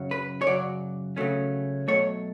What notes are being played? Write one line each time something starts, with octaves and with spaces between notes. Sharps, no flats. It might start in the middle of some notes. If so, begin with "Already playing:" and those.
Already playing: F#2 C#3 F#3 C#4
B4
C#5
F#2 C#3 F#3 D5
C#3 F#3 A3 C#4
B2 F#3 A3 C#5